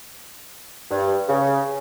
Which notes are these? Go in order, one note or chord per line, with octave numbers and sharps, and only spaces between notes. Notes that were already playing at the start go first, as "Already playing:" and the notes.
G2
C#3